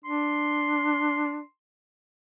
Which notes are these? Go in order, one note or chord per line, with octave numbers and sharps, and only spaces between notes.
D4 C6